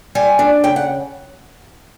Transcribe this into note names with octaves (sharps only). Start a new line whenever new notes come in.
G3 G#5
D4
C#3 G5
F#5